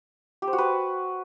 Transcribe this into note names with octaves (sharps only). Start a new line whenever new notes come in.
G4
C5
F#4
B4